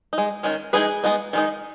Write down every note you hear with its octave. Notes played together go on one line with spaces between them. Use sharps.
D#4
G#3
D#3 G#3 C#4
E3 G#3 D#4 G#4 B4
G#3 B3 D#4
D#3 G#3 D#4